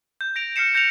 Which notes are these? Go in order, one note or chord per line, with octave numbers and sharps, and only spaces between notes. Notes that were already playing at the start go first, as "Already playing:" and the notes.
G6
A#6 D7 F7
F6 G6 C7 C#7 E7
G6 A#6 C#7 F7